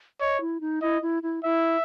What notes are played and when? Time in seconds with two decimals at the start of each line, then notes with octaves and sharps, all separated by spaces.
0.20 C#5 D#5
0.41 E4
0.61 D#4
0.81 E4 D#5
1.02 E4
1.23 E4
1.44 E4 E5